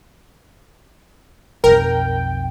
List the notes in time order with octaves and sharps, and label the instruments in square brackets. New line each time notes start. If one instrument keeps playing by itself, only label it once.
[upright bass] B1 F2 [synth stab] A#4 [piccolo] G5